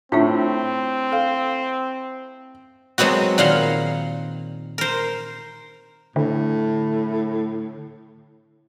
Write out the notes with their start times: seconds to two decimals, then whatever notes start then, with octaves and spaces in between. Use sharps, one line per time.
0.12 A2 C4 D4 F4 E5
1.12 A4 F5
2.98 F#3 G#3 B3 C4 F#4
3.38 A#2 D#3 F5 F#5 C6
4.78 A#4 C5
6.16 A2 D3